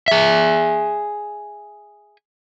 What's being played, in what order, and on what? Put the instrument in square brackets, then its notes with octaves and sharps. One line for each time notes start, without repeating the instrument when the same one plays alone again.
[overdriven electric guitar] G#4 E5